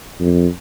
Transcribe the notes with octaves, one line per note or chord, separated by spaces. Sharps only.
F2